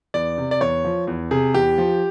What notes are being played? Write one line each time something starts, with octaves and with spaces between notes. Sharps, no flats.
E2 D5
C3
D5
E2 C#5
F3
E2
C3 G#4
E2 G4
F3